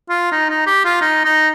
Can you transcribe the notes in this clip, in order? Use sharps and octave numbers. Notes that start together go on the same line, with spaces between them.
F4
D#4
D#4
G4
F4
D#4
D#4